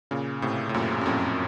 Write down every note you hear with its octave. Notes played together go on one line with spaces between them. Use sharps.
A#2 C#3
A2 C3
A2
F#2 A#2
F#2
F2 A2